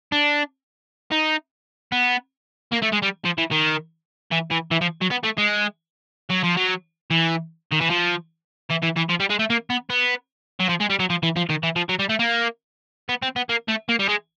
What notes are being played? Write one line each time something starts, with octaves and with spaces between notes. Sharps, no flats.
D4
D#4
B3
A#3
A3
G#3
G3
F3
E3
D#3
E3
E3
E3
F3
F#3
B3
A3
G#3
F#3
F3
F#3
E3
D#3
E3
F3
E3
E3
E3
F3
G3
G#3
A3
A#3
B3
B3
F#3
F3
G#3
G3
F#3
F3
E3
F3
D#3
E3
F3
F#3
G3
A3
A#3
B3
C4
B3
A#3
A3
A#3
G3
G#3